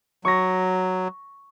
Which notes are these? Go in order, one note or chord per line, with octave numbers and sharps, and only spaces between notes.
F#3 C#6 A#6